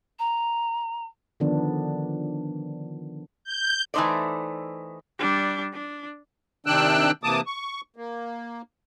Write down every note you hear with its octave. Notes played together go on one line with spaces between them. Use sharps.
A#5
D3 D#3 F3 B3 D4
G6
E3 A3 B3 D#4 C5 D5
G3 D4
D4
C3 D#3 D4 G5 E6 F#6
C3 E3 A#3 A5 D6 D#6
C#6
A#3